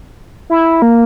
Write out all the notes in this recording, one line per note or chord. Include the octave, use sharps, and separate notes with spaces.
E4
A#3